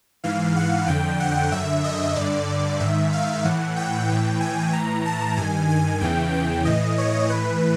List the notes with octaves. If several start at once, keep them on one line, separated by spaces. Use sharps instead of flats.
G#2 E3 F5
F#5
F2 D3 G5
F#5
F#2 D3 E5
D#5
G2 D3 D5
G#2 D#3 E5
F5
A2 E3 F#5
G5
A2 E3 G5
G#5
A2 E3 A#5
A5
G2 D#3 G#5
G#5
E2 C#3 E3 G5
G5
A2 E3 D#5
C#5
A2 E3 B4